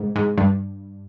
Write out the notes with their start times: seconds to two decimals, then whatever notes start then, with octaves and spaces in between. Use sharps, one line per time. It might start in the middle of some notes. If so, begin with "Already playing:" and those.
Already playing: G#2 C3
0.16 G#2
0.38 G2